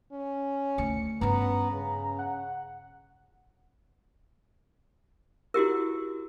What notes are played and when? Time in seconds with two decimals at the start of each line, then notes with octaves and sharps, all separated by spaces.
0.12 C#4
0.78 D2 C#7
1.21 G2 B3 C#4 A#5
1.72 C#3
2.19 F#5
5.54 E4 F#4 G4 A#4